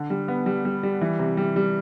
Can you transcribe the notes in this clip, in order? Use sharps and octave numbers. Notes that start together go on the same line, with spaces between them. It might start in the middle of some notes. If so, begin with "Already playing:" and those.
Already playing: D3
G3
B3
G3
G3
G3
E3
C3
G3
G3